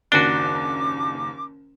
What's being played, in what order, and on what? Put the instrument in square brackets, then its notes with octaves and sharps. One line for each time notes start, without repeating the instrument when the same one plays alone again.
[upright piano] F#1 D#2 G7 [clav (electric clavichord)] D4 F#4 [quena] D6